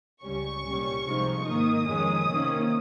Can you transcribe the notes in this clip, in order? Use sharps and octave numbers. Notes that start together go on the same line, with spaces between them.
C#2 C#3 G3 C#4 C#6
C2 A#2 G3 C#4
C2 C3 F3 G#3 D#4
G#2 D#3 A#3 D#4 D#6
F2 D#3 G#3 C#4
C3 D#3 A#3 C#4